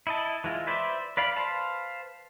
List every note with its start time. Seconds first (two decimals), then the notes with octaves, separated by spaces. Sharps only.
0.07 E4 D#5 A5
0.44 E3 G#3 F4
0.67 B4 C5 D5 E5
1.17 B4 D5 F5 B5
1.36 B4 C5 F5 A5